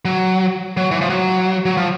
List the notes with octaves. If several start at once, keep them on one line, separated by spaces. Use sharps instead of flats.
F#3
F#3
E3
F3
F#3
F#3
F3